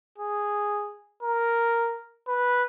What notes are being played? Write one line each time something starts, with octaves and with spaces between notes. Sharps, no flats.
G#4
A#4
B4